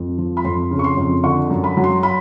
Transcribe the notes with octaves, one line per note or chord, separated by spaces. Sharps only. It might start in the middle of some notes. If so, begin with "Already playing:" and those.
Already playing: F2
F3
B5
F2 C6
C#3
C#6
C6
F2
D3 C#6
F#2
B5
F#3
C6
B5